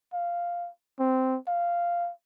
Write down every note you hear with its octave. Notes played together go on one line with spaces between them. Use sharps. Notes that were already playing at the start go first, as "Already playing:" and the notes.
F5
C4
F5